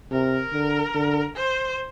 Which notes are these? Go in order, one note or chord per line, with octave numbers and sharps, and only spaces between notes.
C3 A#4
D3
D3
C5